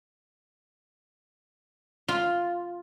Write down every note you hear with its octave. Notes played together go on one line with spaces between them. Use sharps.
F4